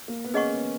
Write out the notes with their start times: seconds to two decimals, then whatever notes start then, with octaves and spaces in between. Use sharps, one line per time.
0.08 A#3
0.24 B3
0.34 C#4 G#4 D#5 F#5 C#6
0.52 B3